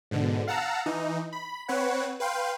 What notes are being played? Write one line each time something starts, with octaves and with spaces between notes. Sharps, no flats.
G#2 B2 D3
F5 F#5 A5 A#5 E6
E3 D#4
B5
C4 B4 C#5 F#5
B4 F5 G5 C6